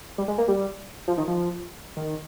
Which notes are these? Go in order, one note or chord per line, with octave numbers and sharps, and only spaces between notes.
G3
G#3
A#3
G3
F3
D#3
F3
D#3